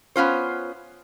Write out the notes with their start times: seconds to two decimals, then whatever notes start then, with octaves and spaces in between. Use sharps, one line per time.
0.16 B3 C#4 F4 C5